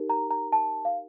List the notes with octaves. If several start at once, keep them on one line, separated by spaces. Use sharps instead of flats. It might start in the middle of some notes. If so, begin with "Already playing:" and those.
Already playing: D#4 G4 A#4
A#5
A#5
A5
F5